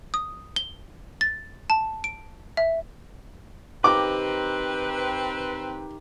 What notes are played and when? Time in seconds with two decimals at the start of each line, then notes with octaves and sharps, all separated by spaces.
0.14 D#6
0.56 G7
1.21 A6
1.70 A5
2.04 D7
2.57 E5
3.84 D#3 C4 G4 B4 A#5 D6